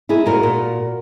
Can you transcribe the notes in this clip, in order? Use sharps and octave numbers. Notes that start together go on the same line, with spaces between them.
D#4 E4 G#4
A#2 F#4 A#4
A#2